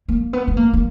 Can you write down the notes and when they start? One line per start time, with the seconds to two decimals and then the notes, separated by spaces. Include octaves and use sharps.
0.08 A#3
0.33 B3
0.48 B3
0.57 A#3
0.73 A#3